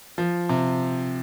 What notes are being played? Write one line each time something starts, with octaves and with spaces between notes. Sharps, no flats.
F3
C3